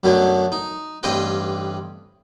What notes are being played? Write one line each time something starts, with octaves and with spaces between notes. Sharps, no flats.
F#2 B2 D3 F#3 A3
D#4
A1 G2 C4 B4 D#5 G5